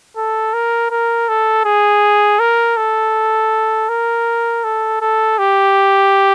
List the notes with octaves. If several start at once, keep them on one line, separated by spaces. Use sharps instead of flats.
A4
A#4
A#4
A4
G#4
A#4
A4
A#4
A4
A4
G4